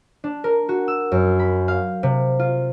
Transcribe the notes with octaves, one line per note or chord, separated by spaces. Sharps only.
D4
A#4
F#4
E6
F#2
B5
F5
C3
F4